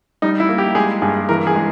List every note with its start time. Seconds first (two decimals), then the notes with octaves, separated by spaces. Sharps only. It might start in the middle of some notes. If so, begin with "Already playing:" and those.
0.22 G3 D#4
0.40 E4
0.49 A#3
0.58 G4
0.75 G#3 G#4
1.02 G2 G#4
1.29 E3 A#4
1.47 G#4
1.55 G#3